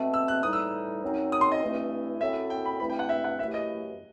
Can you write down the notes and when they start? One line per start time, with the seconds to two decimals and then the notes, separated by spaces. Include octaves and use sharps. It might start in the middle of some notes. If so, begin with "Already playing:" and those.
Already playing: B2 A3 C4
0.14 E6
0.28 F#6
0.43 A2 E3 G3 D#4 D#6
0.53 E6
1.02 F#2 F#3 C4 D#4
1.32 D#6
1.41 C6
1.52 D#5
1.61 G2 E3 A3 C4 E4
2.20 F#2 F#3 C4 E4 A4 E5
2.50 G5
2.65 B5
2.80 G2 E3 A3 C4 E4 B5
2.90 G5
2.99 F#5
3.09 E5
3.24 F#5
3.39 F#2 E3 A3 E4 G4 E5
3.54 D#5